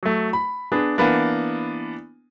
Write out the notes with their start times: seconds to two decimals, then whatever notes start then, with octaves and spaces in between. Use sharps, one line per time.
0.03 F#3 A3
0.33 B5
0.72 B3 D4 G#4
0.98 E3 A#3 B3 D4